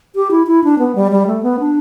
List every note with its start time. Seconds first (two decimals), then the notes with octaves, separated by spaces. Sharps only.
0.15 G4
0.31 E4
0.47 E4
0.64 D4
0.79 B3
0.95 G3
1.11 G3
1.27 A3
1.43 B3
1.60 D4